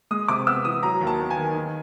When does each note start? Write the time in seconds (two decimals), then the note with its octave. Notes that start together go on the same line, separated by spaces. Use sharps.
0.11 G#3 D#6
0.28 C3 D6
0.47 B3 E6
0.65 E3 D#6
0.83 F#3 A#5
1.01 D#2
1.07 A5
1.20 B3
1.30 G#5
1.37 D#3
1.54 D#3